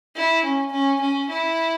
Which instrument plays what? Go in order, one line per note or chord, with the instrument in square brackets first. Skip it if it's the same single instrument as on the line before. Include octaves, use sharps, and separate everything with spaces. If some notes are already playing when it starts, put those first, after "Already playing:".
[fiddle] E4
C#4
C#4
C#4
E4